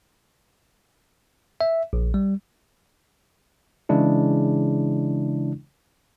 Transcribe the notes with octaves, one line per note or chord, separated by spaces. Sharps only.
E5
A#1
G3
C#3 E3 G#3 D4 E4